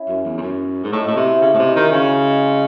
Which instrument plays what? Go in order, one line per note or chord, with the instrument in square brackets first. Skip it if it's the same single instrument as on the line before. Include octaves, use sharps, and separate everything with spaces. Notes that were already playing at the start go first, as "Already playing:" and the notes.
Already playing: [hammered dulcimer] C#4 E4
[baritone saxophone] F#2
E2
E2
F#2
G#2
[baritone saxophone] A2 [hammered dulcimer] D#4 F#4
[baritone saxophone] A2 [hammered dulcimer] E4 G#4
[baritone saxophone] C3
[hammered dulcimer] E4 G#4
[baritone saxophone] C#3 [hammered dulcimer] E4 G#4
[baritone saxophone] A2 C3 [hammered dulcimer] D#4 F#4
[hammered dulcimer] C#4 E4
[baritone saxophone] D#3 [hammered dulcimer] G#3
[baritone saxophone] C#3 [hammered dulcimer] F#3
[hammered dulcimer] G#3
G#3 C4